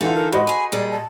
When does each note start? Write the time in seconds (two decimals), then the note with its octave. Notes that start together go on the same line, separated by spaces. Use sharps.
0.01 D3 E3 D#4 F4 A4 F#5
0.15 A#4
0.32 G#2 F#4 C5 D#5 B5
0.47 G#4 G#5
0.72 A#2 G3 G#4 D5
0.91 A5